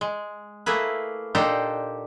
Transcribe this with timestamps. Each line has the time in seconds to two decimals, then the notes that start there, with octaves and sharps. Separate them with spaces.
0.01 G#3
0.66 A3 A#3 E4 G#4 B4
1.35 A#2 D4 D#4 G4 A4 C5